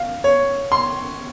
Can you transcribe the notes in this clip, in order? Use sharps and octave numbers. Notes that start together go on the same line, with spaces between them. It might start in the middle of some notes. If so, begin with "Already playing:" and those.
Already playing: F5
C#5
C6